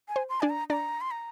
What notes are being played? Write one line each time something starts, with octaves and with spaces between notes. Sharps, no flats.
G#5
C5
C6
D4 D5 G#5
A#5
D4 D5 A#5
C6
A#5